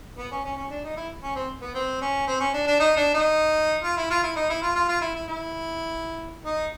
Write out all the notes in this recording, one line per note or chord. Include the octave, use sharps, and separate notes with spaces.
B3
C#4
C#4
C#4
D4
D#4
E4
C#4
C4
B3
C4
C#4
C4
C#4
D4
D4
D#4
D4
D#4
F4
E4
F4
E4
D#4
E4
F4
F4
F4
E4
E4
E4
D#4